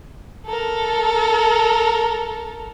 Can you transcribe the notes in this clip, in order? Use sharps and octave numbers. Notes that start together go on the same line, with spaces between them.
A4 A#4